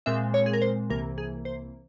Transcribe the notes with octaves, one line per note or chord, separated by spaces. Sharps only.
A#2 G#3 C4 E5
C#5
G#4
A#4
C5
C2 C3 E3 A#3 A#4
G#4
C5